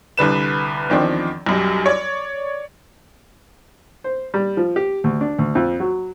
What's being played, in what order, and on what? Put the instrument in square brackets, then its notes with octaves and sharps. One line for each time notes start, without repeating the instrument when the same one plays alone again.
[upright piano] C2 D3 B4 E7
E2 D#3 F3 C4 D4
B1 F#2 G3
C#5 D5
[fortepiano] C5
G3
F3
G4
D2
D4
D2
F2
F#3